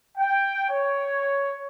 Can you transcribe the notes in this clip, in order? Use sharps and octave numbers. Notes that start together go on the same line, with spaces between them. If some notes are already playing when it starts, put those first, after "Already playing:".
G5
C#5